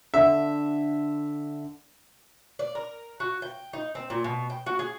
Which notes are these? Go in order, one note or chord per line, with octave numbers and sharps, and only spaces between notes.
D3 E5
D5
A#4
F#4
G5
D#4
C4
A#2
B2
G5
F#4
G#4